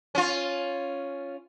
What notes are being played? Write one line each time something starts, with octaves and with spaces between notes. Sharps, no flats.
C#4 F4